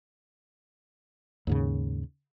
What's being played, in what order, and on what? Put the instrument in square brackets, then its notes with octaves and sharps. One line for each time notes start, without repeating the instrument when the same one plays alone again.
[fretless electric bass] D#2 G#2 C#3